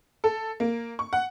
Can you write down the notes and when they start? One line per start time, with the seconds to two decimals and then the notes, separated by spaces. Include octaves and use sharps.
0.24 A4
0.60 A#3
0.99 C#6
1.13 F#5